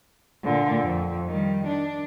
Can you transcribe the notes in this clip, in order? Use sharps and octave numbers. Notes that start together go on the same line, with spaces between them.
A#2 D3
F2
D#3 G3
D4